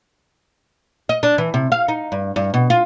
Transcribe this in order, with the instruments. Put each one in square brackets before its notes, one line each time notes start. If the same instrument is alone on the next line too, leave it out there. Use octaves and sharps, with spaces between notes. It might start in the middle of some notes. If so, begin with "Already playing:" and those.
[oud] D#5
D4
E3
C3
F5
D#4
G2
G2
B2
F4